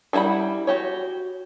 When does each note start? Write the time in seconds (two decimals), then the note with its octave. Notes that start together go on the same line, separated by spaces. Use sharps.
0.13 G3 E4 A4 F#5 B5
0.67 F#4 G4 C#5